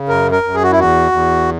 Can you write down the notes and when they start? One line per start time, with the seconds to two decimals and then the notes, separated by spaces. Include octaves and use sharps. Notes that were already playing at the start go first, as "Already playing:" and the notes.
Already playing: C#3
0.08 F#2 A#4
0.31 A#4
0.43 F#2
0.55 G#4
0.63 F#4
0.71 E4
0.77 E2 F#4
1.12 E2